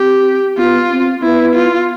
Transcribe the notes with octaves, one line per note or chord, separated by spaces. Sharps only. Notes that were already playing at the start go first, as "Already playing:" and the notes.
Already playing: C4 G4
B3 F4
C4
B3 E4
F4